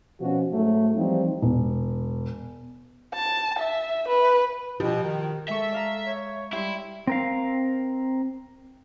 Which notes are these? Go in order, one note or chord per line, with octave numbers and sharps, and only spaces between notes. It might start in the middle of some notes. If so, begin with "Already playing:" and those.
B2 F3 C#4 F#4
G#2 F#3 A3
E3 F3 G3 C4 D#4
E1
A5
E5
B4
B2 F3 G4
D#3
G#3 A4 E5 C#6
D5 F5 A#5
C#5
G3 E4 G4 E5 C6
C4 A#4 F5